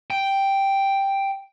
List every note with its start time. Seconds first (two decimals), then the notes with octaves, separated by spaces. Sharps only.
0.10 G5